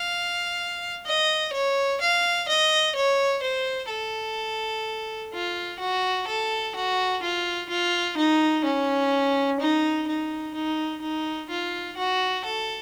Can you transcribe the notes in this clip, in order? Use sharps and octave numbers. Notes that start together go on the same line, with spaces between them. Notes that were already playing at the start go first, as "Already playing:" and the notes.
Already playing: F5
D#5
C#5
F5
D#5
C#5
C5
A4
F4
F#4
A4
F#4
F4
F4
D#4
C#4
D#4
D#4
D#4
D#4
F4
F#4
A4